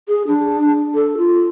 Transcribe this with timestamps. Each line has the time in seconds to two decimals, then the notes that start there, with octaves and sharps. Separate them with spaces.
0.09 G#4
0.27 D4
0.95 A4
1.18 F4